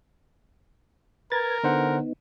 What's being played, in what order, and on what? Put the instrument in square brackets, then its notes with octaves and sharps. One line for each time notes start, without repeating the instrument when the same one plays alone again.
[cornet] A#4 [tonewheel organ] B4 A#5 G#6 [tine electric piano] A6
[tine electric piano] D3 C5 F#5 [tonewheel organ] B3 D#4